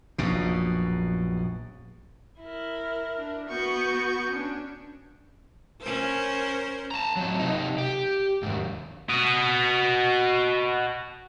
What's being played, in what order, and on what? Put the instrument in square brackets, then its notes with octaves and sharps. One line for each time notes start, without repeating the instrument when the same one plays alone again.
[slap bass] A#1 F#2 B2
[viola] E4 A#4
[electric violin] D4
[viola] B3 F#4 [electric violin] C#6 G6
[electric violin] C#4 D4
[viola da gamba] C#4 A#4 C5
[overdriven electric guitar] A5 A#5
F#3 C4
C3 D#4
G4
D#2 G#2
[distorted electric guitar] F#4 D#5